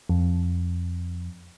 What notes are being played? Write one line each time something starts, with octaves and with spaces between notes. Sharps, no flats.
F2